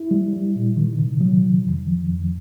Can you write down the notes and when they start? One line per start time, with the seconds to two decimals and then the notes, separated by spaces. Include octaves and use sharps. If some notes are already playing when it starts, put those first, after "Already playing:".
Already playing: E4
0.11 G3
0.33 G3
0.56 A#2
0.76 D#3
0.99 C3
1.21 F#3
1.42 D#3
1.65 F2
1.87 F3
2.09 F2